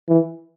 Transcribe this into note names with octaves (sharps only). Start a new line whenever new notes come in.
E3